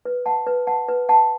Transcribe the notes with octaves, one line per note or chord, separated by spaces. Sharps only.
B4
F#5 A5
B4
F#5 A5
B4
F#5 A5